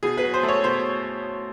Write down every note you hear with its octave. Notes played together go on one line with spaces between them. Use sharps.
B2 G#4
B4
F#3
C5
A3
C#5
B2 C5